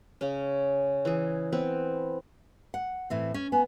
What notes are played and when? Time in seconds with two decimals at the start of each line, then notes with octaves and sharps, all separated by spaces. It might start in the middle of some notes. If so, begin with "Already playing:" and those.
0.21 C#3 C#4
1.05 E3 G#4
1.52 B3 C4 B4
2.74 F#5
3.10 A2 E3 C4
3.34 C#4
3.52 B3 G#5